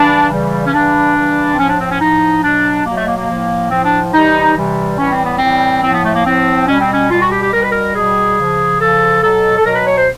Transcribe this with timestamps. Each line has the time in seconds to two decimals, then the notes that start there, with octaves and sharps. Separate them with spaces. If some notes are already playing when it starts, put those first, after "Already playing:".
Already playing: C#3 E3 G3 D4
0.31 C#3 E3 G3
0.66 C#4
0.74 C#3 E3 G3 D4
1.16 C#3 E3 G3
1.53 C4
1.59 A2 F3 C#4
1.69 D4
1.80 C4
1.91 C#4
2.01 A2 F3 D#4
2.43 B2 F#3 D4
2.86 B2 F#3 A#3
2.97 A3
3.07 A#3
3.18 A#3
3.29 A2 F3
3.71 A2 F3 C4
3.85 D4
4.13 C3 E3 G3 D#4
4.56 C3 E3 G3
4.98 A2 E3 G3 C#4
5.12 C4
5.25 B3
5.39 A2 E3 G3 C4
5.83 A2 F3 C4
5.94 B3
6.05 A3
6.15 A#3
6.26 A2 F3 C4
6.68 B2 G3 C#4
6.81 C4
6.93 C#4
7.10 B2 G3 F4
7.21 F#4
7.32 G4
7.42 G4
7.53 B2 G3 A#4
7.62 B4
7.72 A#4
7.95 B2 G3 G#4
8.38 C#3 F3
8.80 C#3 F3 A4
9.23 B2 F#3 A4
9.57 A4
9.65 B2 F#3 A#4
9.76 B4
9.87 C#5
9.97 C5